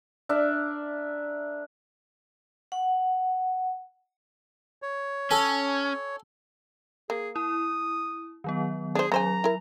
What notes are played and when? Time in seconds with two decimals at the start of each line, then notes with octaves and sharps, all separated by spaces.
0.29 D4 A#4 E5
2.72 F#5
4.82 C#5
5.31 C#4 A4 G#5
7.10 A#3 G#4
7.36 E4 D#6
8.44 D#3 F#3 B3
8.95 D4 G#4 C5
9.12 C#3 F#3 C5 G#5 A#5
9.44 E4 A#4